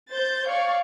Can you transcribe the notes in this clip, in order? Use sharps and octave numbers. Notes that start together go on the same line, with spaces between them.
C5 G6 A6
C#5 D5 F5 C#6